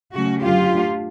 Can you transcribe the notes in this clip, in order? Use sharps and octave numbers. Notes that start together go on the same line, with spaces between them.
C#3 F#3 A3 C#4 F#4
F#2 D3 F#3 F4 G4
A2 F#3 A3 D4